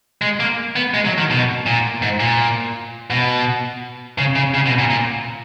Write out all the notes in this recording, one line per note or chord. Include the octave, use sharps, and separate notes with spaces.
G#3
A#3
B3
G#3
F#3
D#3
B2
A#2
G#2
A#2
B2
C#3
C#3
C#3
B2
A#2
A#2